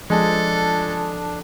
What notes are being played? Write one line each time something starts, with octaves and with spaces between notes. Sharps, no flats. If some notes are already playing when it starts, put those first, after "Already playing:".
F3 G#3 D4 A4